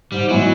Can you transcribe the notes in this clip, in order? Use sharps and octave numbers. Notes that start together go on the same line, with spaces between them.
G#2 G3
E3 F#3 G#3 B3 E4